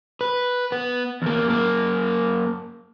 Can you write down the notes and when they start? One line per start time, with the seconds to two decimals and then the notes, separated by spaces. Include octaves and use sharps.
0.21 B4
0.72 B3
1.22 E2 A#3
1.48 F#2 A#3